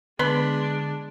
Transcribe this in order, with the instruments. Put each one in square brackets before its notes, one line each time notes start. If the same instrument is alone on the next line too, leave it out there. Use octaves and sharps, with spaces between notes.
[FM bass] D3 [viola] G#3 D4 [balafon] B3 [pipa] B4 B5 C6